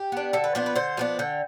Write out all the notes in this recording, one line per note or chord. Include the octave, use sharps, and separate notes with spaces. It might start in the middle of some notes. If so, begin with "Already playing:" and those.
Already playing: G4
B3 D4
D3 A4
B4
F3 B3 D4 C5
B4
D3 C5
F3 B3 D4
D3 G5